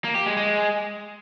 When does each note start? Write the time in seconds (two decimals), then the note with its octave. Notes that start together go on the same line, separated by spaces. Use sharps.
0.04 A#3
0.15 G4
0.26 G#3
0.37 G#3